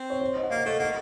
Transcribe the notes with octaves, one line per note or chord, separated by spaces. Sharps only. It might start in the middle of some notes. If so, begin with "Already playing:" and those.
Already playing: C4
C#5
C5
D#5
F#5
A#3 F5
A3 D#5
A#3 F#5